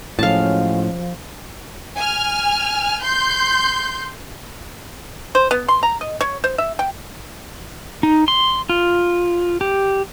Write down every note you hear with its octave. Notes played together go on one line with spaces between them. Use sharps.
A2 F3 F#3 G#3 C#4 F5 A5
G#5 F6
C6 G6
C5
B3
C6
A#5
D#5
C#5
C5
E5
G5
D#4
C6
F4
G4